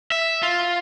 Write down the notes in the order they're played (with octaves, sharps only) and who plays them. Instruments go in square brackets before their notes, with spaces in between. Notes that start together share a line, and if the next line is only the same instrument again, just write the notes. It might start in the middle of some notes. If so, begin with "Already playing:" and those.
[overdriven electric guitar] E5
F4